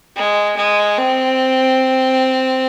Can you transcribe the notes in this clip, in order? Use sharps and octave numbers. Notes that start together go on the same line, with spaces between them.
G#3
G#3
C4